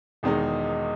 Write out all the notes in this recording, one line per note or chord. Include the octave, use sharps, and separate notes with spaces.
E1 E2 D#3 G#3 D#4